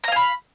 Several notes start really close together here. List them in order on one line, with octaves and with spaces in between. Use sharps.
A#5 F5 G#5 B5